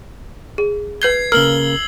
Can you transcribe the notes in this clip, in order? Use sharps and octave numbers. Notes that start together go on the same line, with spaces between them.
G#4
B4 G6 G#6 C7 G7
C#3 A#3 A#4 E6 F6 F#7 G7